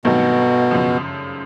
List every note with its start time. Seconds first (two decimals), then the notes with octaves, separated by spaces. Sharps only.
0.05 G2 B2 D#3 F#3 A3 C4
0.71 F#2 C#3 F3